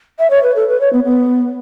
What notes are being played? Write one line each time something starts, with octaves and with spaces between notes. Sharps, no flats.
E5
C#5
B4
A4
B4
C#5
B3
B3